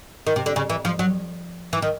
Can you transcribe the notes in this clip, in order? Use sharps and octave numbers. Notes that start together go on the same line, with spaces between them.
D#3
C3
D3
C#3
E3
F3
F#3
E3
D#3